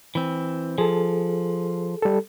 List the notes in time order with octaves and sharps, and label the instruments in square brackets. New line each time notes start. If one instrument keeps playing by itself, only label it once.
[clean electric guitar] E3 C4
[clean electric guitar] F3 [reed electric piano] G#4 A4
[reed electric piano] G3 A4